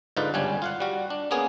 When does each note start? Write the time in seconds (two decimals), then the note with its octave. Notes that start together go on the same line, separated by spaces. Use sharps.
0.17 G#2 D3 D#4 F4 B4 D5
0.34 G1 C#2 G3 C#4 D4 G#5
0.62 F4 F5 F#5
0.80 G3 F#4
1.10 D4
1.31 A#3 B3 C#4 G#4